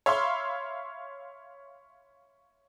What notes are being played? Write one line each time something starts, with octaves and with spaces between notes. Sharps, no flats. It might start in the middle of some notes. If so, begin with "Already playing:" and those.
C#5 E5 F5 B5 C6